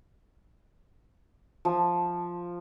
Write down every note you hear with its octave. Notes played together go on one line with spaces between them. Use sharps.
F3